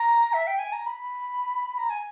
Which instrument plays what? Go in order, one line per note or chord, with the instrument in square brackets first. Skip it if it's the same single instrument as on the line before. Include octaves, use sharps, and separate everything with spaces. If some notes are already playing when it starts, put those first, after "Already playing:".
Already playing: [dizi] A#5
E5
G5
G#5
A#5
B5
A#5
G#5